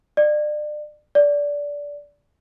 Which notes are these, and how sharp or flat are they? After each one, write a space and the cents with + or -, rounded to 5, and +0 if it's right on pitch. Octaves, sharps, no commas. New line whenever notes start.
D5 +35
D5 -15